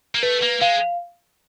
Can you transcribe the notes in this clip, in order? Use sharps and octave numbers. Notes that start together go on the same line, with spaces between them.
A#3
A3 B4
A#3
G#3 F5